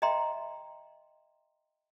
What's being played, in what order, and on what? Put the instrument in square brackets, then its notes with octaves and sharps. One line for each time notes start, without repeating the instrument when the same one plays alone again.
[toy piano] D#5 E5 G5 A#5 C6